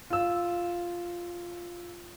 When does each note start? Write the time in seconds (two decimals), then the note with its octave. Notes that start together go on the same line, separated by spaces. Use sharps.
0.10 F4 E6